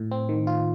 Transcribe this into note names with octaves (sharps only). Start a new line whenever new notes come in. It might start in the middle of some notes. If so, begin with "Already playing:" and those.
Already playing: A2
C4
D#3
F4